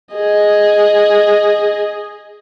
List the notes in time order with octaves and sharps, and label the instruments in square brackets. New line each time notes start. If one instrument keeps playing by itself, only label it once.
[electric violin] G#4 D#5